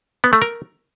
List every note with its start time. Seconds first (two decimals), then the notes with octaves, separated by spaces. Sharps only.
0.24 B3
0.33 A3
0.42 A#4